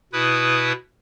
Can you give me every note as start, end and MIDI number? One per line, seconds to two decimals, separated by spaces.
0.13 0.72 47
0.13 0.72 64
0.13 0.72 71
0.13 0.72 87